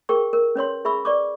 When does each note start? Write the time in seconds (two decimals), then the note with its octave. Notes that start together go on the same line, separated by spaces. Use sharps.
0.09 G#4 A#4 G5 C#6
0.33 A#4
0.55 C#4 B4 C#5 C6
0.85 G#4 E5 B5 C#6 E6
1.05 B4 D5 C#6 D6